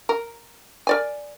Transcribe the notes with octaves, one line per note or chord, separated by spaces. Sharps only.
A#4
A#4 D5 G#5